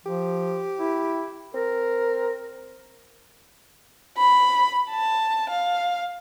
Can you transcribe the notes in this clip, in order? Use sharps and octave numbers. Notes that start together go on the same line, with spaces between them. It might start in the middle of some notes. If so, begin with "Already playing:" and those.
F3 G4
E4
C4 A#4
B5
A5
F5